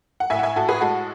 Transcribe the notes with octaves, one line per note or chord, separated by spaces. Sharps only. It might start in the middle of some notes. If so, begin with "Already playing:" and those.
F#5
A2 E5 G#5
F#5
E5 G#5
A2 F#4 A4
G#4 B4
G#3 F#4 A4